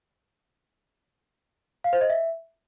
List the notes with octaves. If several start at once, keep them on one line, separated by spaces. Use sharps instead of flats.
F5
C5
D#5
E5